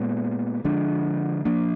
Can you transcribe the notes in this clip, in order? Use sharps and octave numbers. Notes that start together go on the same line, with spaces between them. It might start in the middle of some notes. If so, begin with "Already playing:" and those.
Already playing: A#2 G#3 B3
D3 F3 G#3 D4
F3 A#3 D4